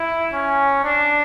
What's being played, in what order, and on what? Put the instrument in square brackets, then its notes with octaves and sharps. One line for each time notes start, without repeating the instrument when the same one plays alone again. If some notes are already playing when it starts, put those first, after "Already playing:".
Already playing: [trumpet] E4
C#4
D4